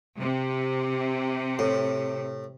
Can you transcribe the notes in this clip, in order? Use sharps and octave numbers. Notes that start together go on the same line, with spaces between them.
C3
A2